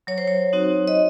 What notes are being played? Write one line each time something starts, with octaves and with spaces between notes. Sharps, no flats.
F#3 C#5
C5
C#5
C4 D#4 F#4
D#5